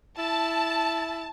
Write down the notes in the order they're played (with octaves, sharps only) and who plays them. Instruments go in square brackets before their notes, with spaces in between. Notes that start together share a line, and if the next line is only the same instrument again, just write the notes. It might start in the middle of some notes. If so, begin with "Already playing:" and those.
[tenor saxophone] E4 [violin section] A5